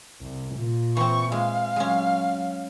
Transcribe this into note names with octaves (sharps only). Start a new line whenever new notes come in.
C2
A#2
E3 C4 C#6
G#3 F5
F#3 G#3 C#4